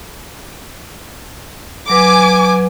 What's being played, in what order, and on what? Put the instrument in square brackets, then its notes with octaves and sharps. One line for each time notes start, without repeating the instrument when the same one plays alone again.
[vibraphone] F#3 B4 [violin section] G#5 D6